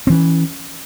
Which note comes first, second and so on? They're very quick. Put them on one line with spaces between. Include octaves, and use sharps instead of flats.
C4 E3 C#4